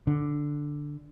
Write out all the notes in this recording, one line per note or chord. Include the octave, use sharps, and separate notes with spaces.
D3